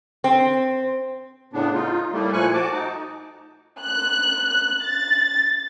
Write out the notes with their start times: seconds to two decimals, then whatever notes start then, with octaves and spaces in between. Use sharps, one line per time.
0.24 C4
1.53 A2 C#3 B3 D4
1.74 D#4 F4
2.12 A2 G3 A3 A#3
2.33 A#2 F3 A3 G#5 C#6 F#6
2.54 F#4 A5 D6
2.72 D#4
3.80 F#6
4.48 F#6
4.83 A6